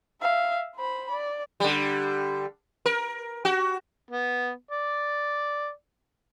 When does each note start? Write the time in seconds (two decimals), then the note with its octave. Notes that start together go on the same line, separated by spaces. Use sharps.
0.21 E5 F5
0.76 C5 B5
1.11 D5
1.60 D3 G3
2.86 A#4
3.45 F#4
4.11 B3
4.71 D5